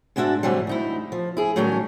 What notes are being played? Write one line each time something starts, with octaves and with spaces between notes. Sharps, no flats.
G#2 G#3 D4 F#4 E5 A5
G#2 C3 E3 F#3 G3
D2 D#4 E4
F3
E4 G#4
A2 D#3 F#3 G3 C#4